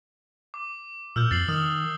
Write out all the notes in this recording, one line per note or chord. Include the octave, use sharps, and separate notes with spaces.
D6
A#2 E6 F6 G6
F2 A6 C7 F#7
D#3 D#6 F6